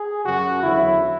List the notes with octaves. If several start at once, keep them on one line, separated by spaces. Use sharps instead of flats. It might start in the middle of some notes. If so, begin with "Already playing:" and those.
Already playing: G#4
F#2 C#3 F#3 F#4
E2 D3 F#3 E4